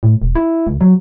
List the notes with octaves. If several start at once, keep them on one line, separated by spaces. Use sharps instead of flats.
A2
E1
E4
C#2
F#3